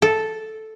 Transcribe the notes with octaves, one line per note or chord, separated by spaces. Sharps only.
A4